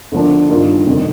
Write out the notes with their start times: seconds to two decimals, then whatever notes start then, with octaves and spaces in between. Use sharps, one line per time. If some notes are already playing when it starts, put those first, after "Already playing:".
0.12 D2 D3 F3 A#3 D4
0.49 G2 D#3 A#3 F4
0.86 F1 F2 D#3